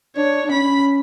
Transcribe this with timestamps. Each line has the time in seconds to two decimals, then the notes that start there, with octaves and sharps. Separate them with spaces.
0.17 D4 C#5
0.46 D4
0.51 C#4 B5